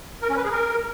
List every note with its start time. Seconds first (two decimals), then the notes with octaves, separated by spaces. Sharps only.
0.22 A#4
0.29 C#4
0.37 B4
0.44 G#4
0.51 A#4